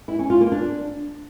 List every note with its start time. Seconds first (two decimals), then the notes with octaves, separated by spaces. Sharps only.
0.08 E4
0.19 C#4
0.30 F4
0.41 A#3
0.52 D4